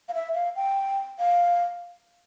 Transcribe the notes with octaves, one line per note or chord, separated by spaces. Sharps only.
F5
E5
F5
G5
F5